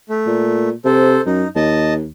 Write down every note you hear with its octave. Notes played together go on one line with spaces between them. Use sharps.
A3
A#2
C3 A4 C5
F#2 D#4
D#2 D#5 A5